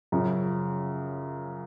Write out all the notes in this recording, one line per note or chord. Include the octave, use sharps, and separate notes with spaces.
F#2 C#3 F3